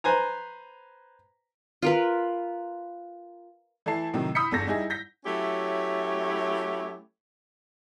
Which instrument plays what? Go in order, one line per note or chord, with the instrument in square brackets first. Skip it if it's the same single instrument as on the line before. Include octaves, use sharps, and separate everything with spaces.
[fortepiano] B4 C5 G#5 A#5
[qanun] F4 A#4 B4
[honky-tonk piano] E3 A3 E4 A5 C7
A2 C3 D#3 F#3
B5 D#6 E6 G6 B6 C#7
G1 E2 A4 A#6
G3 D#4 E4 G#4
G6 A#6 B6
[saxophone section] F#3 A3 C#4 E4 G4 C#5